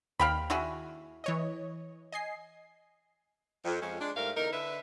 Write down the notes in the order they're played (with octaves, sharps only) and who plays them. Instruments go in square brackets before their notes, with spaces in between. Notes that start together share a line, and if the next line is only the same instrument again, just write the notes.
[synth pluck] D#2 [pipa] F5 G5 B5
[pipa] E4 F#4 G#4
[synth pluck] E3 C#5 D#5
D#5 G#5 C7
[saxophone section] F2
F2 F3 G#3 C#4
G#3 D4
G#2 G3 A3 A#4 F5
E2 D3 D#4 A#4
D3 D4 B4 E5